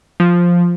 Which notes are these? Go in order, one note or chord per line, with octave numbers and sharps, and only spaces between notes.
F3